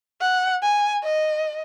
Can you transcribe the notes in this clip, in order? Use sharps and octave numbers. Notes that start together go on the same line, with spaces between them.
F#5
G#5
D#5